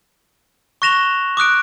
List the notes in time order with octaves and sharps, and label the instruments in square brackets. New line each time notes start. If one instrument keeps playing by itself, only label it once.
[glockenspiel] C#6 F#6 A#6 E7 F7 G7
D6 D#6 F#6 D7